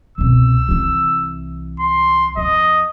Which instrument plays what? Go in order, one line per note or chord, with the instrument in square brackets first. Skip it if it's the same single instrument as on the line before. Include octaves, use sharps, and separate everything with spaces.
[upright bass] C2 B2 [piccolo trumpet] E6
[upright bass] C2 E3
[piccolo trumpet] C6
[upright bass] F2 [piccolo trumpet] D#5